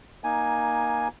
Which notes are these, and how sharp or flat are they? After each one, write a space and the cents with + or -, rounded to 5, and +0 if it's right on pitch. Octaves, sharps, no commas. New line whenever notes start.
A#3 +15 D#4 +0 G#5 +0